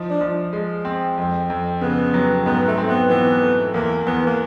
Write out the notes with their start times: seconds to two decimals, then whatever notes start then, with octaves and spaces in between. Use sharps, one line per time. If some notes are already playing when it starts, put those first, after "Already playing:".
Already playing: F3 D#4
0.10 D4
0.21 F3
0.53 G#3
0.85 C4
1.17 F2
1.50 F2
1.81 C#3 B3
2.14 F#3
2.46 G#2 B3
2.67 A3
2.78 C4
2.89 B3
3.10 E3 B3
3.42 A3
3.74 E2 A#3
4.07 E2 B3
4.27 A#3